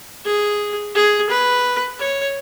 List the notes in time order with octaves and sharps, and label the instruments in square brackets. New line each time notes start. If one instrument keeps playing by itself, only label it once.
[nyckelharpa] G#4
G#4
B4
C#5